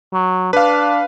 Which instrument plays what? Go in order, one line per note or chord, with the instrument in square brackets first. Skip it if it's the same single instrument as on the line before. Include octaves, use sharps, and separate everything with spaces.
[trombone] F#3
[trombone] D4 [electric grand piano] B4 F5